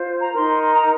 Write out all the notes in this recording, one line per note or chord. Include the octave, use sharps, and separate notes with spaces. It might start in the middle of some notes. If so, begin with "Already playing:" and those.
Already playing: F4 C5
A#5
D#4 A#4 C6
C6
A#5